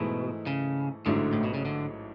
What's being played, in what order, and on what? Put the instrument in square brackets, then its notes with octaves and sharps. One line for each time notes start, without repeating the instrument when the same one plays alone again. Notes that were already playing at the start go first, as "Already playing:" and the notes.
Already playing: [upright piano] G#2 E3 A3 E4 G#4 [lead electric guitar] B2
[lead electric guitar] C#3
[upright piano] A1 G#2 F#3 A3 D4 [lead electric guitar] D3
[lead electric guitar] A2
B2
C#3
D3